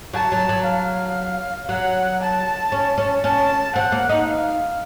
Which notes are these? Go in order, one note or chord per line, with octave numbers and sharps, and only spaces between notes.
F#3 A5
F#3
F#3
F5
F#3 F#5
A5
C#4
C#4
C#4 A5
C4 F#5
A#3
D#4
F5